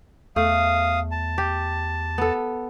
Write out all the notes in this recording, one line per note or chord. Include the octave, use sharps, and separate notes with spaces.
E2 A3 F5 D#6
A5
G4
B3 A4